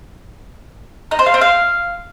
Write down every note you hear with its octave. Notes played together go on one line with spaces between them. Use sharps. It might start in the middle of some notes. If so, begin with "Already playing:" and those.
D#4
C5
F5
C4
F5